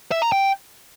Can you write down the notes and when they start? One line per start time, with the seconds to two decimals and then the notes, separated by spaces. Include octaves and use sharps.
0.12 E5
0.22 A#5
0.32 G5